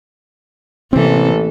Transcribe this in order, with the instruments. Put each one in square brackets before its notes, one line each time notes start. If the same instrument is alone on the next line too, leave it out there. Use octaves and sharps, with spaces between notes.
[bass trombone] A1 [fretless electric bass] C3 C4 [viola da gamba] E3 A#3 A4